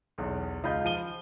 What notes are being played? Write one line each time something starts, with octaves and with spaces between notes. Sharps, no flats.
B1 E2
C#2 F4 D#5 B5 G6
F3 D#7 G7